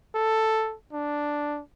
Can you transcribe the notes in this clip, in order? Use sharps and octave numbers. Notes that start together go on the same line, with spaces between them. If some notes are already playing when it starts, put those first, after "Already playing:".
A4
D4